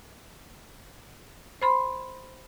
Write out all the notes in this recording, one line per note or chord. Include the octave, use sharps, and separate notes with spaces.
C5 B5 C6